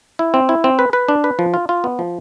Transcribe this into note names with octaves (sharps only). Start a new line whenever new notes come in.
E4
C4
E4
C4
B4
B4
D4
B4
F3
F4
F4
B3
F3